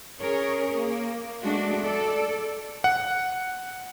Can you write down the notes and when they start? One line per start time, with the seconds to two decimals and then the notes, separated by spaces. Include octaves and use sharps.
0.20 C#4 G#4 A#4 C#5
0.74 A#3
1.43 G#3 A3 D4 F#4
1.81 A4 D5
2.84 F#5